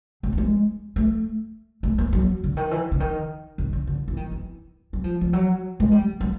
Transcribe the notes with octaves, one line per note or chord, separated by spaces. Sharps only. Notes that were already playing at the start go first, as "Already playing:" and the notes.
F#3
A3
G#3
A3
A3
A#3
F#3
D3
D#3
E3
D3
D#3
D#3
D3
D3
E3
D#3
E3
F#3
F3
F3
F#3
G#3
G3
F#3